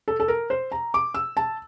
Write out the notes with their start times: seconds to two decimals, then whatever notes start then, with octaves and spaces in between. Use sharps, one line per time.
0.08 A4
0.20 A4
0.28 A#4
0.50 C5
0.72 A#5
0.94 D6
1.14 E6
1.37 A5